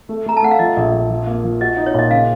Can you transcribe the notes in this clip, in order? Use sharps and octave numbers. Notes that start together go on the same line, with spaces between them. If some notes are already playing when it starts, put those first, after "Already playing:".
A3
A3 A#5
A5
A3 F#5
F5
F3 D#5
A#1
A#1
F3
A#3
F3
F#4 D#5
D#4
C#5
A#2 D#5
C#3 F5